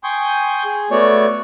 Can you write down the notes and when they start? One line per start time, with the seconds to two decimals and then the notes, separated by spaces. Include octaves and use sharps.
0.04 G5 G#5 C6 C#6 D#6 G6
0.65 G#4
0.91 A3 B3 F#4 C#5 D5 C#6